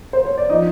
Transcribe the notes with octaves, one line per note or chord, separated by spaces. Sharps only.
C5
C#5
D5
F3 D#4 D#5